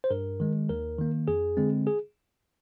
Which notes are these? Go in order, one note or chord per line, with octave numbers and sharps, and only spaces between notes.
C5
G2 A#4
D#3 G#3
D#2 A#4
D#3 A#3
F2 G#4
D3 G#3 C4
G#4